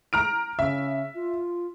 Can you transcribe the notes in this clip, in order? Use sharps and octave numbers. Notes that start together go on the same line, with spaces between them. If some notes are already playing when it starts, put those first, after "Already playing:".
A#5 F6 D7
C#3 E5
F4